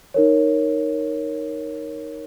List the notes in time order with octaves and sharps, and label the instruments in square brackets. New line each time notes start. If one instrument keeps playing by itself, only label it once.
[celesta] D#4 A#4 C#5